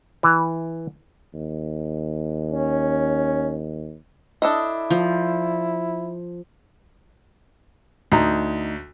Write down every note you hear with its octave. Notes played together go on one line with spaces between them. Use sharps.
E3
D#2
C#4
D4 E4 A4 D#5
F3
D2 D#4 A#5